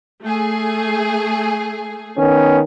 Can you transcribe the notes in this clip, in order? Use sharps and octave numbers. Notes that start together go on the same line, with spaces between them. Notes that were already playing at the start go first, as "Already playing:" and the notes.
A3 G#4
D#3 B3 C#4